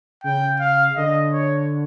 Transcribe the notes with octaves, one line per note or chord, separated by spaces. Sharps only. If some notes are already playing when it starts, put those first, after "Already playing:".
C#3 G5
F5
D3 D#5
C#5